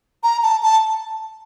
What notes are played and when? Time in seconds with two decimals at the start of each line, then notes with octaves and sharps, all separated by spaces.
0.23 A#5
0.43 A5
0.63 A5